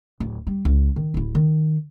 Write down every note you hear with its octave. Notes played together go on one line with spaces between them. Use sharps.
D1
G3
C#2
D#3
D1 E4
D#3